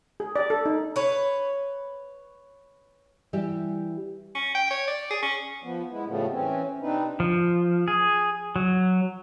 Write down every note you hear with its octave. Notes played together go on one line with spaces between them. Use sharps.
G#4
D5
A4
D#4
B4 C#5
E3 G3 G4 E5
C#4
G5
C#5
D5
G#4
C#4
F3 B3
G#3 B3 E4
A2 C#3 F3 G3 A3 B3
E3 C4 C#4
C3 C4 D4 D#4 B4
F3
G#4
F#3